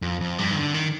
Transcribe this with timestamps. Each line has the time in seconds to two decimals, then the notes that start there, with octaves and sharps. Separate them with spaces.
0.02 F2
0.21 F2
0.38 G2
0.51 D#3
0.56 D3
0.74 D#3